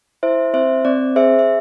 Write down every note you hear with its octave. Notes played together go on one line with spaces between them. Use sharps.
E4 C5 E5
C4 C5 E5
C4 D5
G#4 C5 E5
E5